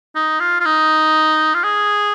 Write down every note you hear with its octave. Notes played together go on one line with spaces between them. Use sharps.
D#4
F4
F4
D#4
F4
G#4